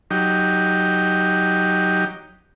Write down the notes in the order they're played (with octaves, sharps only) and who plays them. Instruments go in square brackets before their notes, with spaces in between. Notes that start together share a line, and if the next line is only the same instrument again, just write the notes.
[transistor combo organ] F#3 D#4 G4